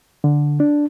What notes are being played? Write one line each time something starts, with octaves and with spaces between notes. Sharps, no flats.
D3
D4